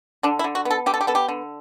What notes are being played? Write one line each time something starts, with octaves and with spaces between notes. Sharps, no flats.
D3 D4
E4
D3
F#4
B3
A4
D3 G4
A4
G4
B3 A4
G4
D3